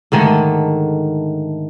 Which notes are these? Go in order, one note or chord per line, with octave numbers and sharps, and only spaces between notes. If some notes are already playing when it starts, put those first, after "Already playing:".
G#2 D3 D#3 A3